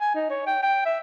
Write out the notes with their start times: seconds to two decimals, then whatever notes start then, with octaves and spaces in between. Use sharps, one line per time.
0.01 G#5
0.15 D#4
0.30 C#5
0.47 G5
0.63 G5
0.85 E5